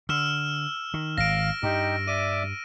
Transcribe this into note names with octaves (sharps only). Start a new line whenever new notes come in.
D3 E6 F6 E7
D#3
G#1 F5 A#6 D7
G2 D#4 G4
D5 E5 D6 D#7